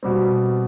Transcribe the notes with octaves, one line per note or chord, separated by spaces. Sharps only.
B2 G3 C4